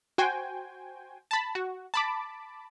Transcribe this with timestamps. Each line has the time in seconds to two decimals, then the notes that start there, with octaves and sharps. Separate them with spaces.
0.18 F#4 C5 G5 G#5
1.31 A5 B5
1.55 F#4
1.94 A5 B5 D6